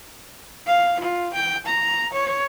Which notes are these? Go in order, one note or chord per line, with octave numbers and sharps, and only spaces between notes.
F5
F4
G5
A#5
C#5